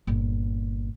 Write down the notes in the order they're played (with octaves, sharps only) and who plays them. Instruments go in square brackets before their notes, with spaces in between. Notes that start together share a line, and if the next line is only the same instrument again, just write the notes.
[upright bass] G1 A#2